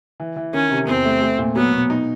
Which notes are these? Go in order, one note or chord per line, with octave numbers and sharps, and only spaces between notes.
E3
E3
D#3 C#4
C3
E2 C4
A3
A3
A#2
F#3 B3
B2
D#4